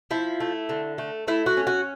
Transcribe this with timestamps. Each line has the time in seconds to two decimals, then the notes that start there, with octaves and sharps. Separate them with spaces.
0.11 F3 E4
0.40 A3
0.69 D3
0.98 A3
1.28 A3 E4
1.46 F#4
1.57 C#4
1.67 F#4